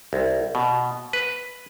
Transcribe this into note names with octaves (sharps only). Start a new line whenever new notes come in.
C2
B2
B4